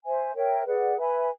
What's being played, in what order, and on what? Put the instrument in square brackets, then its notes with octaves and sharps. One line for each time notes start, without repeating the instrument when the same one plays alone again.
[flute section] C5 E5 G#5
A#4 C#5 E5 G5
G#4 B4 D5 F#5
B4 E5 G#5 B5